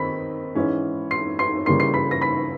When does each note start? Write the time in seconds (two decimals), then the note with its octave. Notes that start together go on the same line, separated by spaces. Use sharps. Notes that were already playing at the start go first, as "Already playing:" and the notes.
Already playing: D#3 C4 B5 B6
0.55 G#2 E3 G#3 C#4
1.11 C6 C7
1.39 C6 C7
1.66 C#3 E3 G3 A#3 C6 C7
1.80 C6 C7
1.94 B5 B6
2.11 A#6
2.21 B5 B6